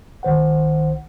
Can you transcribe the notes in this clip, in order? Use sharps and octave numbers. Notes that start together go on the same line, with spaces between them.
B1 D#3 C5 F#5